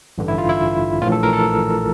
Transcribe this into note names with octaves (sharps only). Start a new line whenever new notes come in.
A1 G2 D3
E4
F4
E4
A#1 A2 E3 F4
A4
A#4
A4